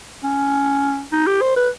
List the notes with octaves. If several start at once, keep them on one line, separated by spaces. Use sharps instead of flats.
C#4
D#4
G4
C5
B4